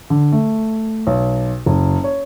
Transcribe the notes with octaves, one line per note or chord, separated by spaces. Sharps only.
D3
A3
B1
F#1
C#5